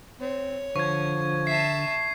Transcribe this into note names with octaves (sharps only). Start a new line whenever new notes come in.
C4 C#5
D3 F3 C#6 G#6
E5 A5 C7